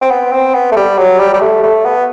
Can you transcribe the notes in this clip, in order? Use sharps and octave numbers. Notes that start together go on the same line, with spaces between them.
C4
B3
C4
B3
A3
G3
F#3
G3
G3
A3
A3
B3